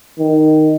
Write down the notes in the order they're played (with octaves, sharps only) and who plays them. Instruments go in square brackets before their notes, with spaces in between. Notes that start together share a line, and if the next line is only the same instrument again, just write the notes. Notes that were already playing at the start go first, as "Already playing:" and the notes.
[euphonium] D#3